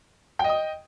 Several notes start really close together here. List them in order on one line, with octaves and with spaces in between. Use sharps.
G5 D#5 D#6